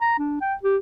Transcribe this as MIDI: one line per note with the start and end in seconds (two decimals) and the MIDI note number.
0.01 0.15 82
0.18 0.37 62
0.41 0.54 79
0.63 0.77 67